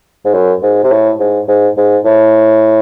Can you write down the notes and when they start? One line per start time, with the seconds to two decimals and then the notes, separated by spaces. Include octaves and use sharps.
0.25 G#2
0.34 F#2
0.63 G#2
0.84 C3
0.91 A2
1.20 G#2
1.48 G#2
1.77 G#2
2.05 A2